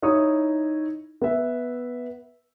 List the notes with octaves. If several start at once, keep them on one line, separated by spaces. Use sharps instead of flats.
D#4 E4 C#5 D#6
B3 E5